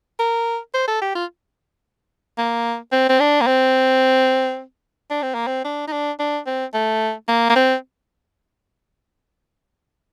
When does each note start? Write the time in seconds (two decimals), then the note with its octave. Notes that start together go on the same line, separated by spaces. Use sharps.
0.19 A#4
0.74 C5
0.88 A4
1.02 G4
1.15 F4
2.38 A#3
2.92 C4
3.09 C4
3.20 D4
3.41 A#3
3.47 C4
5.10 D4
5.22 C4
5.35 A#3
5.47 C4
5.64 D4
5.87 D#4
5.92 D4
6.19 D4
6.46 C4
6.74 A3
7.28 A#3
7.50 A#3
7.56 C4